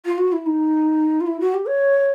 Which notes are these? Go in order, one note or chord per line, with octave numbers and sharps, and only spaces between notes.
F4
F#4
E4
D#4
F4
E4
F#4
G4
C#5